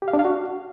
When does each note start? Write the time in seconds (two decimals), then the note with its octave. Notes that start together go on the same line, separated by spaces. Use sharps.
0.02 G4
0.08 F5
0.13 D4
0.19 F5
0.25 F#4